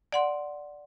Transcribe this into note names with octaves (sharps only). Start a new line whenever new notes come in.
D5 F#5 C6